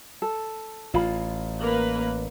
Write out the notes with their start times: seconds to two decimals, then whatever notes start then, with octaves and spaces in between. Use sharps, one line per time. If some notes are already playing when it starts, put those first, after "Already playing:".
0.22 A4
0.94 A1 F4 B5
1.60 A#3 B4